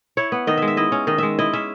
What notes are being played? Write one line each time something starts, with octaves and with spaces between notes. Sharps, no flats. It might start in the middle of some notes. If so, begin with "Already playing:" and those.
E4 C#5
B3
D#3 D#5
G#3 E5
E5
E4 D#5
C#4
D#3 D#5
G#3 E5
E4 D#5
C#4 E5